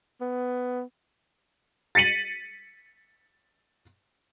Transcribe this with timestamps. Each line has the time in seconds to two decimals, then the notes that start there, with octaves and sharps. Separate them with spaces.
0.21 B3
1.95 A6 B6 C#7 D#7 F#7